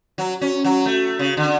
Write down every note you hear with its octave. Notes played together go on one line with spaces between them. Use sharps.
F#3
C#4
F#3
A3
C#3
D3